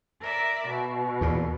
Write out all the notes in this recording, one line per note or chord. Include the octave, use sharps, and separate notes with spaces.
A#4 D5 E5
B2
E2 A#2